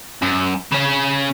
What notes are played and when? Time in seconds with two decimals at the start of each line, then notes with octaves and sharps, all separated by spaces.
0.22 F#2
0.72 C#3 C#4